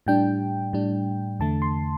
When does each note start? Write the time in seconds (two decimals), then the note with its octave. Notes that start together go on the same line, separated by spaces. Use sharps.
0.07 A2 G3 D4 G5
0.73 A2 G3 D4
1.39 E2 D3 A3 A5
1.62 C6